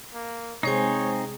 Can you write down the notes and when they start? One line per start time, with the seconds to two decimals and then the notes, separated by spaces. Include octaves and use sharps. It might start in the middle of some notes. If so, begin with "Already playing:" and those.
0.14 A#3
0.63 C3 G#3 C4 D#4 G#4 C5 C#5 G#5